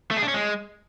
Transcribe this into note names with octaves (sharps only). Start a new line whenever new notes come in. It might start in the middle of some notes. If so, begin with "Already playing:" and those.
A3
G#4
D4
C#4
G#3